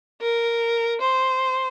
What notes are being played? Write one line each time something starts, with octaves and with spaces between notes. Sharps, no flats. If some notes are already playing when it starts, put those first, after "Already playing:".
A#4
C5